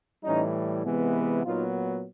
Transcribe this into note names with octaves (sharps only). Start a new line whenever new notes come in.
A2 E3 G3 C#4 D#4
C3 E3 G#3 B3
A#2 F#3 B3 D#4 F4